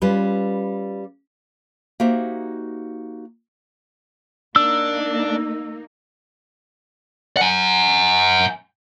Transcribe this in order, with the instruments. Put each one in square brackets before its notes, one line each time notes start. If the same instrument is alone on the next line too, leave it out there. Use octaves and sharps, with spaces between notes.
[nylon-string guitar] G3 C#4 F4 B4
A#3 D#4 F#4 G4 C5 E5
[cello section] A#3 D#4 [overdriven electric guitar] D4 [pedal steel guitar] E6
[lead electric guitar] F#5 G#5